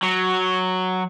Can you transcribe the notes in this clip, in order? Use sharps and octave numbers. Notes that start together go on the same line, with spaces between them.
F#3